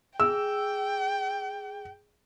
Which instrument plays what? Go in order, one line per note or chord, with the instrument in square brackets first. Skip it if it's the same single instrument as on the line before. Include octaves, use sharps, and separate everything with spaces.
[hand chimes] G#4 [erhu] G5 [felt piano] E6